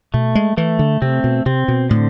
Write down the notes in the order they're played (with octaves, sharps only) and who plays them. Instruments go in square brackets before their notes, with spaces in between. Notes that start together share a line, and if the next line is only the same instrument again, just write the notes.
[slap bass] B2 [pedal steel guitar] A3
[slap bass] G#3
[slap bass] E3 [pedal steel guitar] A3
[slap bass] D3
[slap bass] C3 [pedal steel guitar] C4
[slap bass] B2
[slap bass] C3 [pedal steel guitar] C4
[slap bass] B2
[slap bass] A2 [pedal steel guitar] D3